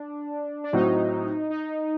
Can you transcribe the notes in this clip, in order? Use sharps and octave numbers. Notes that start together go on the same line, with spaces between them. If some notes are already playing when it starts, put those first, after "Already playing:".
Already playing: D4
D4
A2 F#3 C4 D#4 F#4
D#4